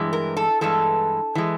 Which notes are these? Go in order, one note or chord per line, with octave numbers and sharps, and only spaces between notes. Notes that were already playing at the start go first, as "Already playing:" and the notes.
Already playing: G2 E3 G#3
A#4
A4
G2 E3 G#3 A4
E3 G#3